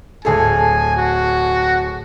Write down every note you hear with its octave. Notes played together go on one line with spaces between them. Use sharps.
D1 G#4 A4 G#5
F#4